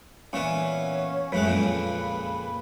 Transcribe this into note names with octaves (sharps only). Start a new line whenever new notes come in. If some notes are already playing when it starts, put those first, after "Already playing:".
A#2 E3 B3 C#4
F#2 A2 G#3 B4
F2 A#2 C#3